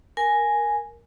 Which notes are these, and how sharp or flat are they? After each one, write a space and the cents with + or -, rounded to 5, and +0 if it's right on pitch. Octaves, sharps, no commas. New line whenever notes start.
A#4 +0 G#5 +0